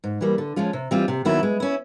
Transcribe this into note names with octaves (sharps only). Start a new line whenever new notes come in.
G#2
E3 G3 A#3
D3
F3 G#3 C#4 F4
C3
E3 G3 C4 F4
C3
D#3 F#3 B3 E4
G#3
C#4 E4